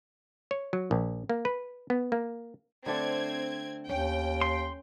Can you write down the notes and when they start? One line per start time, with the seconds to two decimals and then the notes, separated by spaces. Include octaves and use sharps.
0.51 C#5
0.73 F#3
0.91 A#1
1.29 A#3
1.45 B4
1.90 B3
2.12 A#3
2.86 D3 A3 C4 D5 G#6
3.89 D#2 C#4 G5
4.41 C6